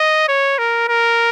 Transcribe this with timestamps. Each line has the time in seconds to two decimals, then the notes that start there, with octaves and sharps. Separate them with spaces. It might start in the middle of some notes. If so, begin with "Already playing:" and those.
Already playing: D#5
0.28 C#5
0.58 A#4
0.88 A#4